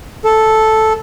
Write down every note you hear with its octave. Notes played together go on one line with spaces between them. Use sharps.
A4